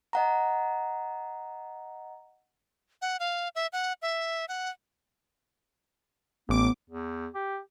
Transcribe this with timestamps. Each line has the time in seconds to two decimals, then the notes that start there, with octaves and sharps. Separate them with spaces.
0.13 D#5 F#5 A#5
3.02 F#5
3.20 F5
3.55 E5
3.73 F#5
4.02 E5
4.49 F#5
6.49 A1 B3 D6
6.90 E2
7.35 G4